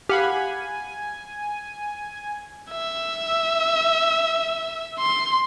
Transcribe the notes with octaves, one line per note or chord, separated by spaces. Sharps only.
G4 F5 F#5 G#5 B5
E5
C6